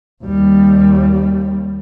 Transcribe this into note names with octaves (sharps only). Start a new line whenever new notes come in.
D#2 G3